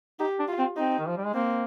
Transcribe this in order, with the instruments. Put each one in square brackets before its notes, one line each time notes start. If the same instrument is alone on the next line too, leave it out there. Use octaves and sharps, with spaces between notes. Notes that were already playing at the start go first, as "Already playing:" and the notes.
[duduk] D#4 [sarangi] G4
[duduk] D4
[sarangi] F4
[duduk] C4
[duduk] C4 [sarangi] D#4
[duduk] D#3
F3
G3
G#3
[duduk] A#3 [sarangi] C4